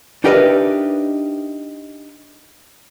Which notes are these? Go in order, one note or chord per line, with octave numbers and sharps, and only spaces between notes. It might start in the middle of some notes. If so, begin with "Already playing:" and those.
D4 D#4 G4 A#4 B4 E5